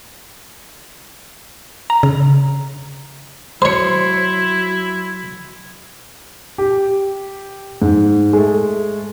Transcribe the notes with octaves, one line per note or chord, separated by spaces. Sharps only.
A#5
C#3
F#3 E4 C5 C#5 C6 C#7
G4
G#2
G#3 A3